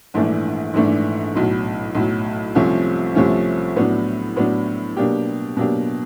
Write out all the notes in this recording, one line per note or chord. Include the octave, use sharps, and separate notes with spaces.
A#1 G#2 E3 A3 D4
A#1 G#2 E3 A3 D4
B1 A2 F#3
B1 A2 F#3
C2 C3 F3 A3 C#4
C2 C3 F3 A3 C#4
A2 F#3 B3 D4
A2 F#3 B3 D4
B2 F#3 A#3 D4 G4
B2 F#3 A#3 D4 G4